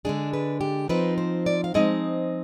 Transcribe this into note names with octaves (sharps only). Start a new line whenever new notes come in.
D3 G#3 D4 G#4
B4
G4
F3 C4 D#4 B4
C5
D5
F5
F3 G#3 C4 D#4 D#5